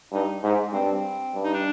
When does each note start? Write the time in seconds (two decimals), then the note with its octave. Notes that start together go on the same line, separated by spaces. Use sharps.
0.12 G2 D#4
0.43 G#2
0.72 G2 C4
0.88 C4
1.34 G2
1.44 D#4
1.54 D4